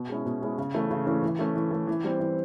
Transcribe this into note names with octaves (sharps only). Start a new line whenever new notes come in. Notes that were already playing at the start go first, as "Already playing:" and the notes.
Already playing: B2
G#3 C#4 E4
B2
G#3 C#4 E4
C#3
E3 A3 C#4
C#3
E3 A3 C#4
E3
A3 C#4
E3
A3 C#4
E3
G3 C4
E3